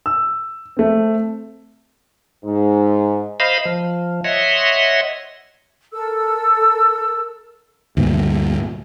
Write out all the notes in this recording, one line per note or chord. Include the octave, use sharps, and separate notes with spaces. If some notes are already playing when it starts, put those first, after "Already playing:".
E6
A3 C4
G#2
C5 D#5 F5 B5
F3
C#5 D#5 E5 F#5 C6
A4 A#4 E6
D2 G2 A#2